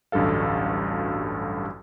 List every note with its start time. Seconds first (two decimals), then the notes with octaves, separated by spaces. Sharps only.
0.12 A1 D2 G2 F#3 A4 F5